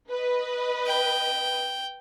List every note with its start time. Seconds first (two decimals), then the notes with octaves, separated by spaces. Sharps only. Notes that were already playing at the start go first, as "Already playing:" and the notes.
0.10 B4 D#5
0.87 G5